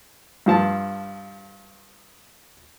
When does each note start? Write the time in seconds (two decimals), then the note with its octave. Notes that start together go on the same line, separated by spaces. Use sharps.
0.46 G2 F3 A5